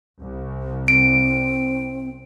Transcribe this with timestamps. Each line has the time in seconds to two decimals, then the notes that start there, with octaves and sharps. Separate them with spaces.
0.21 C2
0.88 C4 D7